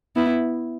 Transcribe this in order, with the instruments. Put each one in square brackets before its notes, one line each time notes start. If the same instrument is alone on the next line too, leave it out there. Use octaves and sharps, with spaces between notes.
[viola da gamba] B3 E4